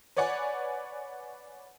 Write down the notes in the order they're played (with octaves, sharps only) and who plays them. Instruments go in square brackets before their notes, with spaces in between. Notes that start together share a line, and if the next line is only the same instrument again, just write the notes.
[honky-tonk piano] B4 C#5 D5 F#5 G#5